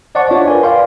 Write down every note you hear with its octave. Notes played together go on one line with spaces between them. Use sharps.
C5 D5 D#5 F#5 A5 C#6
D4 F4 C#5 D5
A#4 B4 D5 G#5
D5 F5 G5 C6